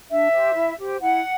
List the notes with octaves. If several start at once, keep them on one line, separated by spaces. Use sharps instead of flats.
D4 E5
G4 C5
E4
G4 C5
E4 F#5